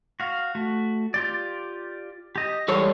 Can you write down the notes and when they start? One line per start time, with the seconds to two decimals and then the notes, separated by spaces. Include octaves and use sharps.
0.20 F#4 F5
0.55 A3 F#4
1.14 F4 G4 D5
2.36 G4 D#5
2.68 E3 G3 G#3 A4 C#5 E6